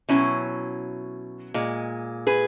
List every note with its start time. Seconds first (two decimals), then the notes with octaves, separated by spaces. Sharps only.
0.09 B2 F#3 C#4 E4
1.54 A#2 G#3
2.27 G#4 B4